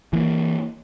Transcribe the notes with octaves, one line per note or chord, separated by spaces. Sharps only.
E3 A#3